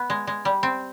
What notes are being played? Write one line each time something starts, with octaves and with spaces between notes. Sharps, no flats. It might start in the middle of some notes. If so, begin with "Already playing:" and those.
Already playing: B3
G#3
G#3
G3
C4